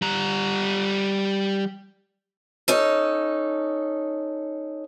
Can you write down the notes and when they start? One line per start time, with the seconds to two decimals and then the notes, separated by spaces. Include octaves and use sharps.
0.02 G3 A#5
2.68 C#4 D#4 A4